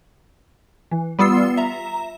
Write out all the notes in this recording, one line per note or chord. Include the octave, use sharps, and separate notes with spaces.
E3
G3 B3 F4 E6 C7
E5 A#5